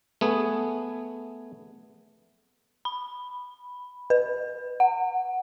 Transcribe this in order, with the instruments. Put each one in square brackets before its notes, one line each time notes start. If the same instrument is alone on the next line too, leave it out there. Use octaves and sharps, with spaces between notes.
[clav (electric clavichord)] A3 B3 G#4
[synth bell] B5
B4
F#5